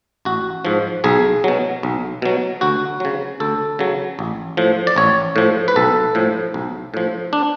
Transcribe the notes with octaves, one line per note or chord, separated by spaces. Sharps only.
A1 F#4
G#2 F3
B1 G#4
B2 F#3
B1
B2 F#3
D2 F#4
C#3 F#3
D2 A4
C#3 F#3
A1
A2 F3
D5
A1 C#5
A2 F3
B4
B1 A4
A2 F3
B1
A2 F3
D4